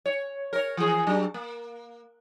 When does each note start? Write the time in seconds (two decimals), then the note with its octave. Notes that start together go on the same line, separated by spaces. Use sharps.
0.06 C#5
0.53 A#4 C#5
0.77 E3 G#4
1.07 F#3 D4
1.34 A#3